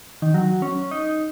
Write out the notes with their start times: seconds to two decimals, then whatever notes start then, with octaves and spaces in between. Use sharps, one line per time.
0.22 D#3
0.34 F#3
0.62 C#4
0.91 D#4